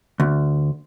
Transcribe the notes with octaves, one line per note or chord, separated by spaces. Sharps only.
D2